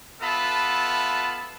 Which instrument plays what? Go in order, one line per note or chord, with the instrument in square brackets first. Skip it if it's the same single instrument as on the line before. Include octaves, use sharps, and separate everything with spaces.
[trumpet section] B3 F4 A4 E5 A5 B5